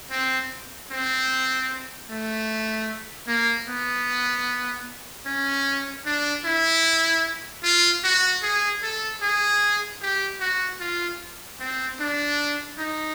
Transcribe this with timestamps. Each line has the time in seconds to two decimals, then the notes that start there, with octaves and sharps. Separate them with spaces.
0.11 C4
0.91 C4
2.10 A3
3.27 A#3
3.67 B3
5.26 C#4
6.06 D4
6.45 E4
7.63 F4
8.04 F#4
8.42 G#4
8.83 A4
9.22 G#4
10.02 G4
10.40 F#4
10.80 F4
11.60 C4
12.00 D4
12.78 D#4